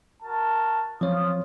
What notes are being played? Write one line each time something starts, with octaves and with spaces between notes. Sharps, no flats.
F#4 A#4 A5
F3 C4 F4 C#5 D#6